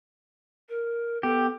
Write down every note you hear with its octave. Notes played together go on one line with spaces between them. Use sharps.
A#4
B3 G4 A4